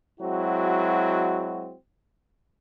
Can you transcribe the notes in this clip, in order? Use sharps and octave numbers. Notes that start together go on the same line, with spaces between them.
F#3 G#3 C4 E4 F#4